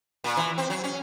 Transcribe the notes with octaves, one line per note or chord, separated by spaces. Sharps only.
A#2
E3
C4
F#3
C#4